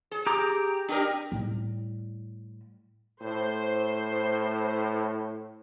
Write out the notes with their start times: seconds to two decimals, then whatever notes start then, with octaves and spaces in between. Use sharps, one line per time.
0.11 G#4
0.26 G4 A#5 D6
0.88 D4 G4 A#4
1.32 A2 G3
3.22 A2 C5